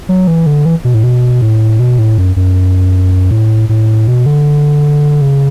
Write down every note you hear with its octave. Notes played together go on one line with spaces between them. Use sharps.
F#3
E3
D3
E3
B2
A2
B2
A2
B2
A2
F#2
F#2
A2
A2
B2
D3
C#3